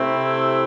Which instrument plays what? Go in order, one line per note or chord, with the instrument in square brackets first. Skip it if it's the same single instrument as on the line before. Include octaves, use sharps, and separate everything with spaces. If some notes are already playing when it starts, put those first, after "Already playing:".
Already playing: [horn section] C3 A3 C4 E4